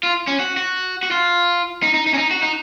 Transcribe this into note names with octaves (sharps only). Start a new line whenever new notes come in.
F4
C#4
F#4
F#4
F#4
F4
D#4
D#4
D#4
C#4
D#4
F#4
D#4